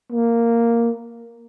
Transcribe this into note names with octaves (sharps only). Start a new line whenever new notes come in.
A#3